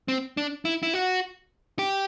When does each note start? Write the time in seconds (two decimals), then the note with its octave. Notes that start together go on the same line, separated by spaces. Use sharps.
0.08 C4
0.37 D4
0.65 E4
0.83 E4
0.94 F#4
1.79 G4